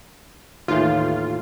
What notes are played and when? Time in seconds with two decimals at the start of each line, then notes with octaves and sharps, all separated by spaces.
0.68 D#2 A2 E3 F4